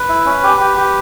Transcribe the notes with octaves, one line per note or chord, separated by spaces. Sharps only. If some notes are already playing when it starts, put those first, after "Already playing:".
Already playing: B4
E4
C#4
G4
G4
G4